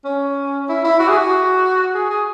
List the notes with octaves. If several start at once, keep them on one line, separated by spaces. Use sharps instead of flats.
C#4
E4
E4
F#4
G#4
F#4
G#4
G#4